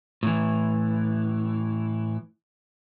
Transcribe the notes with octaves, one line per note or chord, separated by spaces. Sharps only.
A2 E3